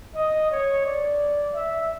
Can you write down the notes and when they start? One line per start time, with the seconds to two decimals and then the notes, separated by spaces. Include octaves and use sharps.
0.15 D#5
0.51 C#5
0.86 D5
1.55 E5